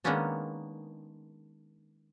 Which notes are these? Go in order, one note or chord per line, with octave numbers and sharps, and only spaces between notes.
D#3 G#3 A#3 B3 C#4 D4